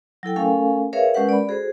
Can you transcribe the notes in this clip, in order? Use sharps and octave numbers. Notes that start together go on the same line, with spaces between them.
F#3 E4 A4 G5
A3 C#4 A4 A#4 F5 G#5
G#4 A#4 B4 C#5 E5 F5
G#3 C#4 G4 A#4 B4 F#5
D5 B5
F#4 G#4 A4 C5